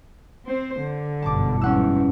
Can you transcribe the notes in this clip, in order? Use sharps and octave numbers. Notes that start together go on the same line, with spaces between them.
C4 C5
D3
G1 F#2 B2 A5 D6
E2 G#2 C#4 F#5 E6